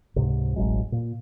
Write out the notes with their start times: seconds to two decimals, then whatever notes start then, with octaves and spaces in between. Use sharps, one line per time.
0.16 C#2 G#2 C3
0.56 E1 A1 F#3 G#3
0.92 A#2